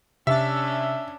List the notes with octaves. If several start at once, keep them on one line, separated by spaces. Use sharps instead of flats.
C3 C#4 D4 E5